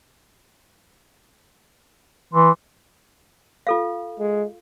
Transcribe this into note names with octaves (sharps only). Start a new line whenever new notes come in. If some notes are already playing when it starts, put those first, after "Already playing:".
E3 C6
F4 A4 F5
G#3